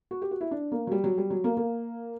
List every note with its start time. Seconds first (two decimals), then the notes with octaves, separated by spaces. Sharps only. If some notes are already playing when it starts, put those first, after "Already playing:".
0.11 F#4
0.22 G4
0.31 F#4
0.41 E4
0.51 D4
0.72 A#3
0.87 F#3
0.92 G3
1.04 F#3
1.18 G3
1.30 F#3
1.44 A#3
1.57 A#3